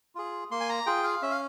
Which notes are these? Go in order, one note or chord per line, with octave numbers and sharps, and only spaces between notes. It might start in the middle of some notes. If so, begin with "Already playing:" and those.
F4 G#4
A#3 C6
G#5
A#5
F4 G#4 G5
F5
C#4 E5
F5